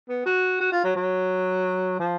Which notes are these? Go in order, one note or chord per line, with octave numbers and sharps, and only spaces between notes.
B3
F#4
F#4
F4
F#3
F#3
F3